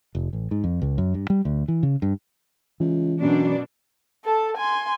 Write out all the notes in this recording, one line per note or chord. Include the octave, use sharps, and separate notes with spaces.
F1
A1
G#2
F2
C#2
F#2
G2
G3
D2
E3
C#3
G2
C#2 E3
F#2 B2 D4
A4 A5
G#5 C6